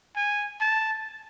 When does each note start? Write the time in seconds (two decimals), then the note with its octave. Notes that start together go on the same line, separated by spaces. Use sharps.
0.16 G#5
0.61 A5